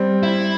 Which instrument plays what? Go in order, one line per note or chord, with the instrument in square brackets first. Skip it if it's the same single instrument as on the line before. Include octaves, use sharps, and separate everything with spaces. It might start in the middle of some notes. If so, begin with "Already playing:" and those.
Already playing: [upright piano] G3 C4
[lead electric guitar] E4